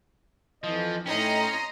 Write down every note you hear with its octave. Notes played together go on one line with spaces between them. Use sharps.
F2 E3 F3 D#5
A2 C#4 D#4 D#5 G5 A#5 C6